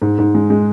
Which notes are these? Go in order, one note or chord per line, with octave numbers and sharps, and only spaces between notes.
G#2
G#2
G#3
G#3